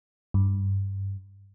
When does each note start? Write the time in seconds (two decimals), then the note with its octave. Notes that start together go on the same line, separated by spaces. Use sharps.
0.34 G2